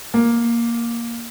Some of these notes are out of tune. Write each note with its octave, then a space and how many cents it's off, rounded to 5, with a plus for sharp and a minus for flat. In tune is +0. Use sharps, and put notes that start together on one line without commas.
A#3 +5